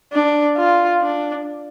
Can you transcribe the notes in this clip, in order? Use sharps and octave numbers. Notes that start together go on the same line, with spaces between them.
D4
F4
D4